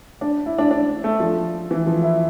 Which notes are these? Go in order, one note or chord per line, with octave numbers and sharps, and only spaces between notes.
D4
E4
D4
D4
A3
F3
E3
F3
E4